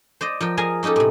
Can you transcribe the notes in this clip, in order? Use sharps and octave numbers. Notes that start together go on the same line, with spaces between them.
C5 D5 D#5
F3 A#4 G5
G#4 A#4 D#5 F5 G#5
A#3 C#4 D#4 G4 A4
A2 C3